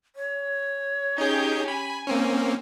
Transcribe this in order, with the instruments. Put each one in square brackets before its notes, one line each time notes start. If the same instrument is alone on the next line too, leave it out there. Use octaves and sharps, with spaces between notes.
[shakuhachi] C#5
[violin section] C#4 G4 G6 [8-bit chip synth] D#4 G#4
[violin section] G#5 [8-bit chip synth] B5
[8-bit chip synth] A#3 C4 C#4